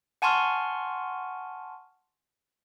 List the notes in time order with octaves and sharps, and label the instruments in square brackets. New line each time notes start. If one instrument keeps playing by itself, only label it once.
[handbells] F#5 G#5 A5 C6 C#6 F6